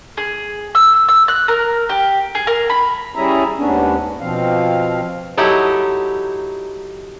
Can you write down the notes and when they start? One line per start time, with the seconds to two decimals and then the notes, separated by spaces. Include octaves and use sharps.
0.17 G#4
0.75 E6
1.08 E6
1.28 F#6
1.48 A#4
1.89 G4
2.35 G#4
2.47 A#4
2.70 B5
3.16 G3 C#4 E4 G#4 E5 A#5
3.58 D#2 G#2 B3 C#4 D4
4.21 B2 F3 C4 F5
5.37 F#3 D#4 E4 G4 A4